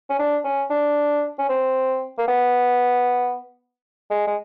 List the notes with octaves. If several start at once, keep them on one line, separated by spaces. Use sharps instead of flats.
C#4
D4
C#4
D4
C#4
C4
A#3
B3
G#3
G#3